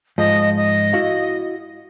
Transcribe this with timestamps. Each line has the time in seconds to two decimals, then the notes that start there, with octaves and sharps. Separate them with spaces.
0.18 G#2 F3 D#5
0.56 D#5
0.93 E4 F#4 F5